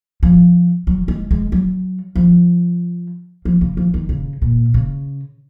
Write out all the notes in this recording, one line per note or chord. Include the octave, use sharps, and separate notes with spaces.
F3
F#3
G#3
G#3
F#3
F3
F3
C#3
F3
D#3
C#3
A#2
C#3